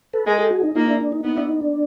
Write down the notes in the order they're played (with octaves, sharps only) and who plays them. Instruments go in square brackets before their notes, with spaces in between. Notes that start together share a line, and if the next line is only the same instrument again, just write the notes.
[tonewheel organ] A4 B4
[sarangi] G#3 [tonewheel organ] G#4 A#4
[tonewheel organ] G4 A4
F#4 G#4
D#4
[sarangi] A#3 [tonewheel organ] D#4 F4
[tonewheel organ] D4 E4
D4
D#4
[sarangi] B3 [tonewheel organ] D#4
[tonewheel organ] D4 E4
D#4
D4